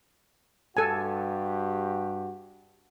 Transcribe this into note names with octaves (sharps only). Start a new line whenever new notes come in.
G2 F#4 G4 A4 G#5